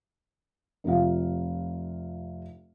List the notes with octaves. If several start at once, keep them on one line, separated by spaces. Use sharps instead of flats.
F1 C3 F4 F5